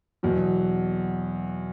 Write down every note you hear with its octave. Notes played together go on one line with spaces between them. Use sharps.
E2 B2 F#3